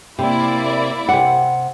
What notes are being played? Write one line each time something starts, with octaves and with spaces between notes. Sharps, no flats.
C3 A#3 E4 D5
C3 F#5